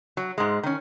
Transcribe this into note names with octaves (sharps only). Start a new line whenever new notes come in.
F#3
G#2 G#3
D#3 C#4